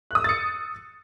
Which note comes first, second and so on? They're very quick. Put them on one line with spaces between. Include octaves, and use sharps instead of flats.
F#6 D#6 E6 A6 C#7